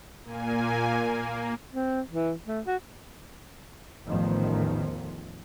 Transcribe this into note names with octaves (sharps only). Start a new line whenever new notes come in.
A#2 A#3 G#5
A#3
C4
E3
A3
F#4
A1 E2 A2 D#3 F3